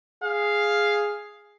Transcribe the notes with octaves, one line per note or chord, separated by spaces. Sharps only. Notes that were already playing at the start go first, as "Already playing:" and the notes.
G#4 F5